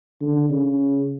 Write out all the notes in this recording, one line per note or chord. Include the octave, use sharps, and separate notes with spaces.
D3
C#3